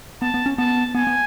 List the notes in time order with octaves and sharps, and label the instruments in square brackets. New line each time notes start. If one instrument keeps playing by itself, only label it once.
[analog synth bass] B3 [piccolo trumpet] A5
[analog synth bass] B3
C#4
[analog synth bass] B3 [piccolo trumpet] A5
[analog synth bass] B3 [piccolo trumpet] G#5
[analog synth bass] B3